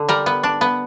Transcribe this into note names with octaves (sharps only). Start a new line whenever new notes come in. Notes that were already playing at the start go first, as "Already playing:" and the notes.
Already playing: D3
G3 A#4
B3
D4
B3